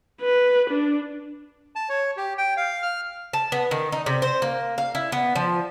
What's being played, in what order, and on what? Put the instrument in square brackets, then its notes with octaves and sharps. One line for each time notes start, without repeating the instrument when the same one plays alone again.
[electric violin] B4
D4
[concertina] A5
C#5
G4
G5
F5
F6
[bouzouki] A5
B3
D#3
D#4
C3
C5
A#3
F5
E4
B3
F3